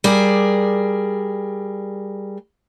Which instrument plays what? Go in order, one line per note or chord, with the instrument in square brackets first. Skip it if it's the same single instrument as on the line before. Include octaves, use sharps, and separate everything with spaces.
[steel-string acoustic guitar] G3 G#4 A#4 D5